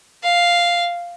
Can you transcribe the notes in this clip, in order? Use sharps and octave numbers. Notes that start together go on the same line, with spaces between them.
F5